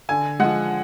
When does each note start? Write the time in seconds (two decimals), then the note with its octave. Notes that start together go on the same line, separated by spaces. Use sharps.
0.09 D3 G#5
0.40 F3 G#3 F#5